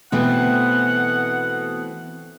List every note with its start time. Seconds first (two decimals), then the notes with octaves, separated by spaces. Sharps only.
0.12 B2 E3 A3 C4 F#5